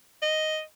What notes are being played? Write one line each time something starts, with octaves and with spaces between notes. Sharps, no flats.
D#5